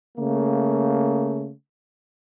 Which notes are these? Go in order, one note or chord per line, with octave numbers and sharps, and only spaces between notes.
C#3 A3 A#3